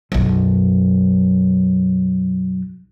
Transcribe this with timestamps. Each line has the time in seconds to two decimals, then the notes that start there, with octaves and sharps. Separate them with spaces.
0.12 B1 F#2